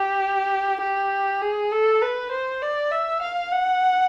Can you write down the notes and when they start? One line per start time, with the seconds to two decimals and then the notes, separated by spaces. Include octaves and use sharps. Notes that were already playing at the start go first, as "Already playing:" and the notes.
Already playing: G4
0.81 G4
1.42 G#4
1.71 A4
2.02 B4
2.31 C5
2.62 D5
2.91 E5
3.22 F5
3.52 F#5